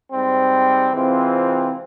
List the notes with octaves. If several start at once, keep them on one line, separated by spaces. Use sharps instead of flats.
G#2 G3 C4
C3 E3 G#3 C4 F4